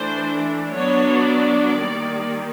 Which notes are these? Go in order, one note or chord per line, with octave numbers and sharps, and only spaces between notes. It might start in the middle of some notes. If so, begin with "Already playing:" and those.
Already playing: E3 A3 D4 C5
F#3 B3 D4 C#5
D5
D#3 G3 A#3